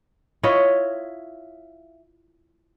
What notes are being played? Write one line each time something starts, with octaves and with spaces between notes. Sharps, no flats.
E4 F4 C#5 D#5